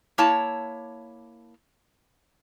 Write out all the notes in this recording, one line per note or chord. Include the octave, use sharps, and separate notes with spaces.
A#3 E4 C#5 A5